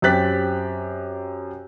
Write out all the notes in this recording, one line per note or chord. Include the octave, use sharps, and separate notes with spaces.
F#2 C4 G4 F#6 A6 B6